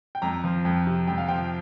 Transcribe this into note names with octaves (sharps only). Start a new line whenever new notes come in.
G5
F2 A#5
F3
F2
C3
F2 G5
F5
F3 G5